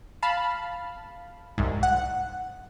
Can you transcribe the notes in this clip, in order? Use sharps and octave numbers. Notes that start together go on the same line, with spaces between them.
F5 A5 B5
C2 G#2
F#5